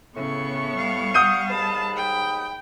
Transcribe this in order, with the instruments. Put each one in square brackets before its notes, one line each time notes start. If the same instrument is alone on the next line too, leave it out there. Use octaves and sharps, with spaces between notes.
[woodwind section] A2 [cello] C#3 [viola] B3 C#6
[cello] G3 F5
[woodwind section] F#5 [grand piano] D#6 G6 D#7
[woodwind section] D#2 G#2 B5 [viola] A5
[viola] G5